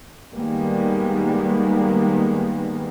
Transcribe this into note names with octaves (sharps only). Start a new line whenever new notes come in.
D#3 G3 G#3 A#3 B3